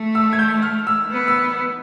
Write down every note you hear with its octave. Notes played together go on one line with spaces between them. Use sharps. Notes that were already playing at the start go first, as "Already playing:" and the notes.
Already playing: A3
E6
G#6
G6
F6
E6
B3
E6